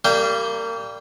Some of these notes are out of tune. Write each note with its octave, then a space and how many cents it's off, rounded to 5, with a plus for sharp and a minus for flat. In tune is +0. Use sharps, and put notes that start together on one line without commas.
G3 +0 A#3 -30 G5 +0